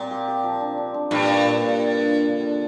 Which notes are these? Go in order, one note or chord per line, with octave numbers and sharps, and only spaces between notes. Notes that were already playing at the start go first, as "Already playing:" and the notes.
Already playing: A#2 G3 C4
G4
G4
F3
D4
D4
D4
G2 A#2
D4
A#2
A#2
F4
D5
F4
D3
D3